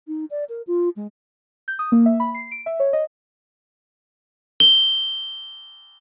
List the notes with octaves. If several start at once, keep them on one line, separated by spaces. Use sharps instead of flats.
D#4
D5
A#4
F4
G#3
G6
D#6
A#3
E5
B5
C7
D7
E5
C#5
D#5
G7